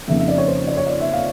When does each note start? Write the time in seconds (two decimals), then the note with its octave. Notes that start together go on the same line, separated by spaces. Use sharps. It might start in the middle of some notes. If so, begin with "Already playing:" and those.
0.08 F2 C#3 F3 A#3 D#4 E5
0.18 E5
0.28 D5
0.38 C#5
0.48 C5
0.67 D5
0.77 C#5
0.87 D5
1.00 E5
1.13 F5